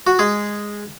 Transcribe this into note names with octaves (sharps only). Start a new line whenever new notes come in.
F#4
G#3 G#4